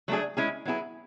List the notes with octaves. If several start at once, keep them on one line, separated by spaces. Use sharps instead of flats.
F#3 A3 D4 G#4
G#3 C#4 E4 G#4
F#3 B3 E4 G#4